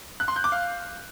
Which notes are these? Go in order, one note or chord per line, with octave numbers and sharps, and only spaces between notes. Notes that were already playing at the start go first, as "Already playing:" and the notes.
F#6
C6
G6
D6
F5